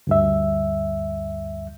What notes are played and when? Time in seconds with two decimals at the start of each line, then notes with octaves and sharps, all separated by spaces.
0.07 D2 G2 E5